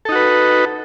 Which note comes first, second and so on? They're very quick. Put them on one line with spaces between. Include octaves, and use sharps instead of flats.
A4 D#4 F#4 B4